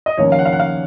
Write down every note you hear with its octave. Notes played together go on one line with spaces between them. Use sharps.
D#5
D#2 C#3 F3 A#3 C#5
F5
F#5
F5
F#5
F5